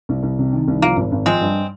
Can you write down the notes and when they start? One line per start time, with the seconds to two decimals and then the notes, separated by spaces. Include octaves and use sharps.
0.09 C2
0.23 C2
0.39 C3
0.53 D#3
0.68 C2
0.82 F3 A#3
0.96 G#1
1.12 G#1
1.26 F3 G#3 C4
1.41 G2